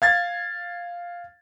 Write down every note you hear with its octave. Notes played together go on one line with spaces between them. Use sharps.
F5 G#6 A6